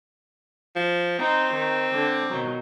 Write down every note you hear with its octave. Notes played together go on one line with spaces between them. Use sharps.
F3
C4 D#4 C6
D#3
D3
B2 D#3 F#3